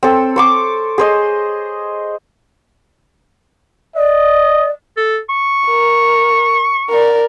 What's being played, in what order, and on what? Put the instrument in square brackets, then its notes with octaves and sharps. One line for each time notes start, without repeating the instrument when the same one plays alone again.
[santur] C4 A4
C5 C#6 D6
G#4 C5 D#5
[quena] D5 [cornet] D#5
[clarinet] A4
C#6
[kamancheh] A#4
A#4 D5